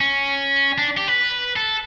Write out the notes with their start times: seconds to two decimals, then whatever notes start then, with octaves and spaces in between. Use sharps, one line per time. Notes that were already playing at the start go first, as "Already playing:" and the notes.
0.01 C#4
0.78 D4
0.97 G4
1.08 B4
1.56 A4